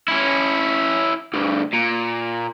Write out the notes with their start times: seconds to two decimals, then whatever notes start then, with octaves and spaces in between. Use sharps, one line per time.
0.08 C#4 E4
1.33 D2 G2
1.73 A#2